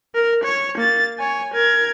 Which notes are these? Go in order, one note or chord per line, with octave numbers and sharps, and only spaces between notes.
A#4
C#5
A#3 A6
C#5 G#5
A#4 G#6